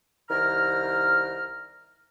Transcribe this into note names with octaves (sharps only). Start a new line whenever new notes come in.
C2 D#3 A#5 F6